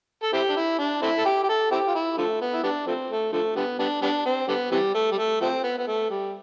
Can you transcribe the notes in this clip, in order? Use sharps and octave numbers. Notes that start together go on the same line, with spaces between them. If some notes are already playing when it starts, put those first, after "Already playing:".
A4
C4 E4 G4
D4
E4
D4
A3 C4 E4
A4
G4
G4
A4
C4 E4 G4
F4
E4
D3 F3 A3
B3
E4
G3 B3 D4
F3 A3 C4
A3
D3 F3 A3
D3 G3 B3
G3 B3 D4
G3 B3 D4
C4
D3 G3 B3
C3 E3 G3
A3
G3
A3
F3 A3 C4
B3
B3
A3
G3